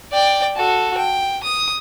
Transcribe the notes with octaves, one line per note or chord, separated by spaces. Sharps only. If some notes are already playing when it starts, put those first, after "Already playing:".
D5 G5
F#4 A4
G5
D#6